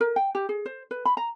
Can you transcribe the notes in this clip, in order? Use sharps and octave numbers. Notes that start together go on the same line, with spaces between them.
A#4
G5
G4
G#4
C5
B4
B5
A#5